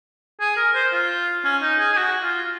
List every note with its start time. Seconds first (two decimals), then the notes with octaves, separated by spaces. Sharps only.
0.40 G#4
0.57 A#4
0.75 C5
0.93 F4
1.45 C#4
1.62 D#4
1.79 G#4
1.93 G#4
1.97 F#4
2.23 F4